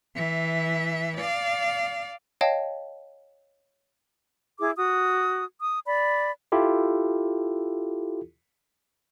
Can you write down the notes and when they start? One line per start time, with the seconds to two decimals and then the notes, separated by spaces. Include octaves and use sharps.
0.15 E3 E5
1.17 D5 F5
2.41 C#5 D#5 F5 G5 A5
4.59 E4 G#4 D6
4.77 F#4 D#6
5.61 D#6
5.87 D5 B5
6.52 E4 F4 G4 A4